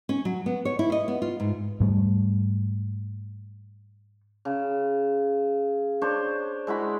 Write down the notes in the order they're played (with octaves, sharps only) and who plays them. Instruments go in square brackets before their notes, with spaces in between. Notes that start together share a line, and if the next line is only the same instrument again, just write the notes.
[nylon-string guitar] C#4
F#3
B3
C#5
E4
D#5
B3
F4
G#2
[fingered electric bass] G#2 G3 A3
[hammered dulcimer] C#3
D4 C5 C#5
G#3 E4 F#4 B5